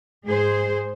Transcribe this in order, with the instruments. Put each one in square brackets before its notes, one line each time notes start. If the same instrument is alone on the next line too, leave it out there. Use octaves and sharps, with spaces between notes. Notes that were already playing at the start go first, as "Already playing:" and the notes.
[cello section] G#2 G#4 C5